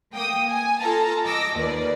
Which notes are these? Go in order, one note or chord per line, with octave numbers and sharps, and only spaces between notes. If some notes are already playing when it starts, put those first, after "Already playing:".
A#3 G5 D#6
G#5
F4 A4 A5 A#5
D#5 D6 E6 A#6
D#2 A#3 B4 D5